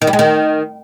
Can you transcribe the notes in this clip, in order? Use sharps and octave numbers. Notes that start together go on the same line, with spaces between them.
D#3
G3
G#3
D#3